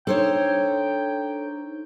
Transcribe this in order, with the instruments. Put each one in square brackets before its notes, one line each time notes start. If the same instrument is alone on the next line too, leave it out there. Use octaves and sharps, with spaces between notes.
[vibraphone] D4 D#4 A#5 [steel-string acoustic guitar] A4 C5 C#5 [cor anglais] G5